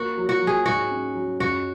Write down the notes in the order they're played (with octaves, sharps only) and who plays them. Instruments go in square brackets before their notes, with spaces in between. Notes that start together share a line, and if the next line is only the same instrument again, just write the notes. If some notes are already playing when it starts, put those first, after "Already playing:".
Already playing: [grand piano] A#3 [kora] F#4
[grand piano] F#3
[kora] F#4
[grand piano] F#3
[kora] G#4
[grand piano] G#2 [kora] F#4
[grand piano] C#4
F#3
[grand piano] F#2 [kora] F#4